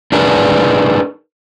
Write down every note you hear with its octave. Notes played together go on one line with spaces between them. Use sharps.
D4 D#4 G#4 A#4 B4